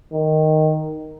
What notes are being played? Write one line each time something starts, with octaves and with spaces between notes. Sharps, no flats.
D#3